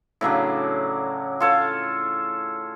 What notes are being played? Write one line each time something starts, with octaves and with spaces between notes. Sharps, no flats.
A2 C#3 F#3 D4
F4 A4 C#5